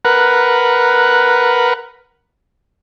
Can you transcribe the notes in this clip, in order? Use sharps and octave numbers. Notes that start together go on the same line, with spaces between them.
A#4 B4 F#5